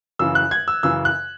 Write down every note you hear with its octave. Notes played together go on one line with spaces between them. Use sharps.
F#2 C#3 E3 E6
F#6
G#6
E6
F#2 C#3 E3 E6
F#6